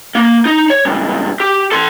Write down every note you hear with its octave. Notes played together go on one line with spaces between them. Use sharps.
A#3
D#4
C#5
C#2 G2
G4
A4 C6